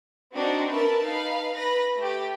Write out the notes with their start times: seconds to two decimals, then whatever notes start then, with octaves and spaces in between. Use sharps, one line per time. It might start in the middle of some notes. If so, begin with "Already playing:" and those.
0.33 C4 D4 D#4 F#4
0.72 A#4 B4 E5 A5
1.02 D#4 B4 F5
1.55 B4 A#6
1.96 A3 G4